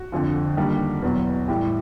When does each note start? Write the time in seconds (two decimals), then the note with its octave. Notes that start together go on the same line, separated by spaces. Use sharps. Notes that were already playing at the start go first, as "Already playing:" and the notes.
Already playing: F#4
0.12 F2 D3 F3
0.57 D#3 G3 A#3 D4
1.02 E2 B2 F#3
1.48 A2 E3 G3 G4